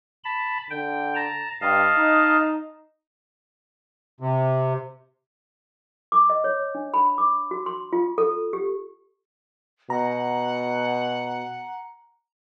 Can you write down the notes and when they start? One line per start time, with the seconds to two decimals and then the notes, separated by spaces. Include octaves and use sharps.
0.24 A5 B5
0.70 D3 G5
1.15 A5 A#5
1.61 G2 D#5 F5 A5
1.98 D#4
4.20 C3
6.12 D6
6.30 D#5
6.44 C#5
6.75 D4
6.94 B5
7.18 D6
7.51 F#4
7.66 C6
7.93 F4
8.18 A4
8.53 G4
9.90 B2 F#5 A#5